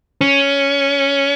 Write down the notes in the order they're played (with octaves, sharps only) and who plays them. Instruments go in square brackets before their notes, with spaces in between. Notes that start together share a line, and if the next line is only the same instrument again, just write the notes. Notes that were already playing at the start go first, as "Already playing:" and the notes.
[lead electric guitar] C#4